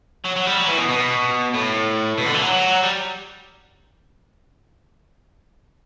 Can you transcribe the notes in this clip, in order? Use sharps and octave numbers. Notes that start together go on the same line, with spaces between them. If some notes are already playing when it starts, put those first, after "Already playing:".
F#3
F#3
G3
F#3
E3
B2
B2
A2
B2
D3
E3
F#3
G3